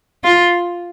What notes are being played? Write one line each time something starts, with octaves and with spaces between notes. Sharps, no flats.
F4